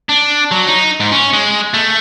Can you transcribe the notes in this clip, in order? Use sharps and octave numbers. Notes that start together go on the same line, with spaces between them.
D4
F#3
D#4
G#2
C#4
G#3
A3